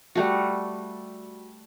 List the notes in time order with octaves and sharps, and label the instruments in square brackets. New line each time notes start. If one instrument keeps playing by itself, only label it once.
[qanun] G3 A3 F#4